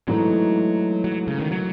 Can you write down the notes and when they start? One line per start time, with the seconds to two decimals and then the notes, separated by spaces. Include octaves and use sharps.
0.08 G#2 E3 F#3 A3 D#4
1.04 F#3
1.27 C#3
1.40 D#3
1.51 F#3